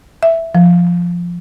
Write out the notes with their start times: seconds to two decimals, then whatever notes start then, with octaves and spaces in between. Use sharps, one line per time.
0.23 E5
0.55 F3